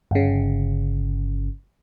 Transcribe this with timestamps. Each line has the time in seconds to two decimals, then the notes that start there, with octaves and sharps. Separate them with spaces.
0.11 G1 C#3